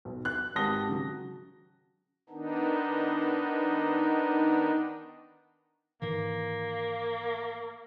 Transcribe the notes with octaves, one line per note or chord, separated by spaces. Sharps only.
B1
F#6
G#1 G4 A5 D#6 A#6 G7
C#3 F#3
D#3 B3 D4 D#4
G#2 D#3 E3 A#3